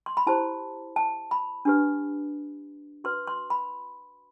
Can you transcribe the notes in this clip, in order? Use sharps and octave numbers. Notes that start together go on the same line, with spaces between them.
C6
B5
E4 G4 C5 A5
A5
B5
D4 G4 B4
F#4 B4 C6
C6
B5